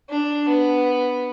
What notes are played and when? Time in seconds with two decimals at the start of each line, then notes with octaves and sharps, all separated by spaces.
0.10 D4
0.48 B3